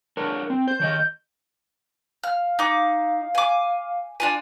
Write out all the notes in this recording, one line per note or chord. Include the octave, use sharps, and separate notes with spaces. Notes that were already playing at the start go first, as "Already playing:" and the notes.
D4 A#4 C#5
C4
C5 G6
D#3 C#5 D#5
F5 F6
D#4 D6
G#5 D6
D4 F4 G#5